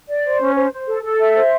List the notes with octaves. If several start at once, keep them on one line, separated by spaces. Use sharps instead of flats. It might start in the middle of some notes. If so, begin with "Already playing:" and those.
D5
C5
C#4
C5
C5
A4
A4
E5
C5